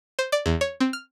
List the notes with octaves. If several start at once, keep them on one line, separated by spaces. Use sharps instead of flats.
C5
D5
E2
C#5
C4
F6